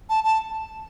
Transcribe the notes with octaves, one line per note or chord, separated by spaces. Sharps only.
A5
A5